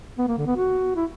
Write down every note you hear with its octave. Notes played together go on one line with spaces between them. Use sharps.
B3
A#3
D3
B3
F#4
E4